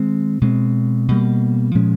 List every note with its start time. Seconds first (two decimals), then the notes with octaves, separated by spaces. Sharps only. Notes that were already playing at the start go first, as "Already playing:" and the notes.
Already playing: D#3 G#3 C4
0.41 B2 G#3 C4
1.08 B2 G3 A#3
1.75 A#2 F3 G#3 C#4